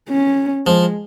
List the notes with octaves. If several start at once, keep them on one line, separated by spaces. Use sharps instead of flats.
C#4
F3 G#3